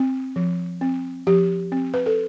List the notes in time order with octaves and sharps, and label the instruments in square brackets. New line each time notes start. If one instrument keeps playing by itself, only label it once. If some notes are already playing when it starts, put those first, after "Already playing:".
Already playing: [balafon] C4
F3
C4
F3 G4
C4
B4
A4